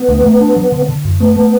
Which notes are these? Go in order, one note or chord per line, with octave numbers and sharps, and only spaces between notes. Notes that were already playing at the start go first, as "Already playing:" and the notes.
Already playing: B3
D2
A3
D4
F#3
D3
D3
F#2
A3 B3
A3